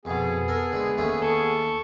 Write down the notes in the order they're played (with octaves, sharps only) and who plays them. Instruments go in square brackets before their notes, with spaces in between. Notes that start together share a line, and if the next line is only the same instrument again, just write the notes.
[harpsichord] F2 B2 [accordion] B3 G#4
[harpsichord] A4 A#4
D3 G#3
D#2 A3 C#4
[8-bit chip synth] A4 C#6